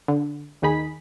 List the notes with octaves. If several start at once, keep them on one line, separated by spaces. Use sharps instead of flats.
D3
D#2 D#3 D#4 G#4 B5 B6